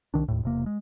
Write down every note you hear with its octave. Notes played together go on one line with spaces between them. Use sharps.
C2 G#2 D#3 D4
D#2 A2
E1 C3 A#3
G#3